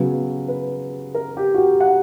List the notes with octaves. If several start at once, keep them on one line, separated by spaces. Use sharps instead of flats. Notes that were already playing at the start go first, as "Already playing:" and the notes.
Already playing: C#3 F#3 B3 B4
B4
A#4
G4
F#4
G4
F#5